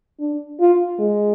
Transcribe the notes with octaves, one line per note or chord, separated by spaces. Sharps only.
D4
F4
G#3